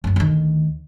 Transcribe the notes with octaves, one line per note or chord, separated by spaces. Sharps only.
F#1 E2
D2 D#3